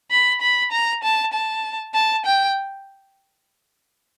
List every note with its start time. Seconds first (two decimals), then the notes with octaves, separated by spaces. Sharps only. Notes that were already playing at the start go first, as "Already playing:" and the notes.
0.11 B5
0.41 B5
0.72 A#5
1.03 A5
1.33 A5
1.94 A5
2.26 G5